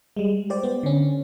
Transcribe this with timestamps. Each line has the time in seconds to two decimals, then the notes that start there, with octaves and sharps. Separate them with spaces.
0.17 G3 G#3
0.50 G4 C5 D5
0.63 B3
0.83 D3 C#4